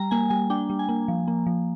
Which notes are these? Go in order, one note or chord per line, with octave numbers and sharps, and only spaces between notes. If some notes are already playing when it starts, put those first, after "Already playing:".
Already playing: G3 A#5
A#3 G#5
G3 G#5
D4 G5
G3
G#5
A#3
F3
A#3
F3